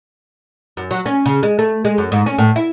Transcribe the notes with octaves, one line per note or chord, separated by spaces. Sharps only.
F#2
F#3
C#4
C#3
G#3
A3
G#3
F#2
G#2
C#4
A2
E4